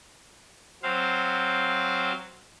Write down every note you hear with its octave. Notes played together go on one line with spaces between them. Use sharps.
F#3 C4 C5 F5